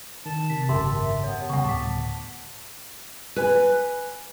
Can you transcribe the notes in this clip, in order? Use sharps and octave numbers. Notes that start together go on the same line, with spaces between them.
D#3 A5
C3 B6
G#1 F#2 C#3 G4 A#4 E5 A5 C6
B3 C#5
C#3 G3 F#5 C#6
D2 A2 A5 D6 B6
B4 G#5